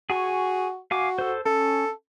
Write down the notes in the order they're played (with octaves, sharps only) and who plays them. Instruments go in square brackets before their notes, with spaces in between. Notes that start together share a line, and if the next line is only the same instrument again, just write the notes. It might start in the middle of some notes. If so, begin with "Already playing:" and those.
[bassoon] F#4 [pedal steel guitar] G#4 G#5 C#6
[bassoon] F#4 [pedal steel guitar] F5 G#5 D6
[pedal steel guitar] A4 C5
[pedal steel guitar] C#4 [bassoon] A4